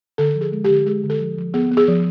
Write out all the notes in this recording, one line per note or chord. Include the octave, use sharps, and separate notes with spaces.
D3 A4
F3
G#4
G#3
D3 G4
G#3 G#4
D3
A4
F3
F3
B3 G#4
B3
G#4
F3